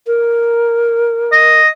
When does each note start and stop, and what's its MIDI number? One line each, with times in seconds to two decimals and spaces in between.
0.07 1.60 70
1.32 1.68 75